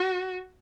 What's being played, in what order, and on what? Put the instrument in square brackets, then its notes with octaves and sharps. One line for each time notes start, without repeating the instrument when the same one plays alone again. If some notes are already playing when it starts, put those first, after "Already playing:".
Already playing: [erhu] F#4